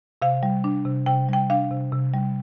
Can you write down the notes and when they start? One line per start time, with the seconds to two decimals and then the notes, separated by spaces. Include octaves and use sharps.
0.22 C3 F5
0.43 G3
0.64 D4
0.85 C3
1.06 C3 G5
1.29 G3 G5
1.50 D4 F5
1.71 C3
1.93 C3
2.13 G3